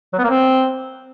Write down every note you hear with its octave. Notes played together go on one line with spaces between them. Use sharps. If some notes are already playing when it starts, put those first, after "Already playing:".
F#3
B3
A#3
C4